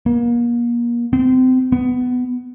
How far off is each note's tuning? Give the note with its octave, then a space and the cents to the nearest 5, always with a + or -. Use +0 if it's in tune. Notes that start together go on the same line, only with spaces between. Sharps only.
A#3 +35
C4 -30
B3 +15